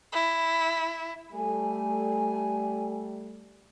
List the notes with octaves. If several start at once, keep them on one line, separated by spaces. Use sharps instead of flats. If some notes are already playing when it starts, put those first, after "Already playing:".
E4
G3 A3 G#5